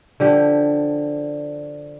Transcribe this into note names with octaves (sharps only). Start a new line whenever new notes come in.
D3 F3 G4